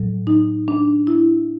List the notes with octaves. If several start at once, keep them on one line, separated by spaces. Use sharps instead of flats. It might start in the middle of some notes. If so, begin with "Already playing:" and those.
Already playing: A2 F#3
D#4
D4
E4